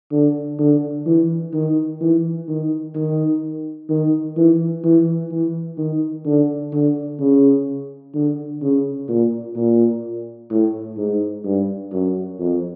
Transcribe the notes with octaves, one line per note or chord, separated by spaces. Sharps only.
D3
D3
E3
D#3
E3
D#3
D#3
D#3
E3
E3
E3
D#3
D3
D3
C#3
D3
C#3
A#2
A#2
A2
G#2
G2
F#2
F2